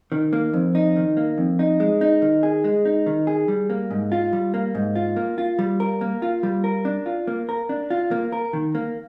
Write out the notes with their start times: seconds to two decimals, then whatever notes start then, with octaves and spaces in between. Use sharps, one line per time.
0.12 D#3
0.33 A#3
0.53 F2
0.75 D#4
0.96 D#3
1.17 A#3
1.38 F2
1.59 D#4
1.80 G#3
2.01 D#4
2.22 D#3
2.43 G#4
2.64 G#3
2.85 D#4
3.06 D#3
3.27 G#4
3.48 G3
3.70 A#3
3.91 G#2
4.12 F4
4.33 G3
4.54 A#3
4.75 G#2
4.96 F4
5.16 A#3
5.38 F4
5.59 G3
5.80 A#4
6.01 A#3
6.22 F4
6.43 G3
6.64 A#4
6.85 D4
7.06 F4
7.27 A#3
7.49 A#4
7.69 D4
7.90 F4
8.11 A#3
8.32 A#4
8.53 D#3
8.75 A#3